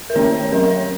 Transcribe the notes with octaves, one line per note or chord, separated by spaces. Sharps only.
A#4
D#3 A#3 C#4 C#5
C#5
F#3 C#4 A#4
C#5